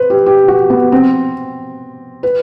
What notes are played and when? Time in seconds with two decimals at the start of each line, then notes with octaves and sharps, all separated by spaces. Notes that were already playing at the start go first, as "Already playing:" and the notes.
Already playing: B4 C5
0.10 G4
0.26 G4
0.48 F#4
0.70 B3
0.92 C4
2.23 B4